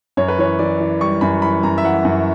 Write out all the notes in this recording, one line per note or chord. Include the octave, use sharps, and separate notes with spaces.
F#2 C#5
B4
E3 C#5
E3 D5
E3
G3 C#6
F#2 B5
E3 B5
F#2 A#5
E5
E3 F#5
F#2